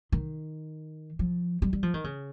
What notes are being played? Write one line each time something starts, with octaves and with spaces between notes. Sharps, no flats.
D#3
F3
G3
G3
F3
D#3
C#3